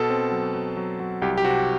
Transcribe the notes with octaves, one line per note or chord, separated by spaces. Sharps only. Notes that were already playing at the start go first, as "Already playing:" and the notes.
Already playing: B2 A4
C4
F#3
F#3
F#3
F#3
C2 G4
G4
C3 F#4